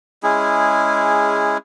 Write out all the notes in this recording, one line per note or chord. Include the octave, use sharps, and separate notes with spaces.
G#3 C#4 E4 G#4